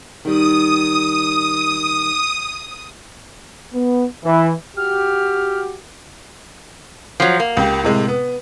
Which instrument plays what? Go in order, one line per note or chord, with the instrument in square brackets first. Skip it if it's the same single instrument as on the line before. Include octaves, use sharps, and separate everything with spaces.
[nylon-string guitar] D#3 G3 [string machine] D#6
[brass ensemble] B3
E3
[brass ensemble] F#4 G4 [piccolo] F6
[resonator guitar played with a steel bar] F3 F#3
A#3
[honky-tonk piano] C#2 G4
A2 C3 G#3
B3